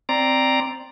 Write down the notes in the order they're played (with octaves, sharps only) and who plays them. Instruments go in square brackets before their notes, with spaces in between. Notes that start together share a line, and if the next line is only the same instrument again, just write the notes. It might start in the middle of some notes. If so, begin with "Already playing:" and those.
[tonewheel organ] C4 D5 A#5